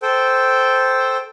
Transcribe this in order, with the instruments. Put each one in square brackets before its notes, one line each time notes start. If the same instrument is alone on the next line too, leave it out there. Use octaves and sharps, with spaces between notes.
[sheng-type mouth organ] A4 C5 G5